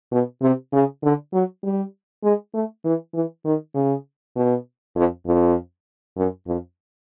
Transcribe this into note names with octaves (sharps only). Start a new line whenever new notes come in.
B2
C3
C#3
D3
F#3
G3
G#3
A3
E3
E3
D#3
C#3
B2
F2
F2
F#2
F2